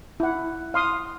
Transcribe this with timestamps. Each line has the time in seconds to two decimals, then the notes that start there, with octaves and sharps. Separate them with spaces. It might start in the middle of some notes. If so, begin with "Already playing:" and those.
0.20 E4 F#5
0.74 F5 C6 D#6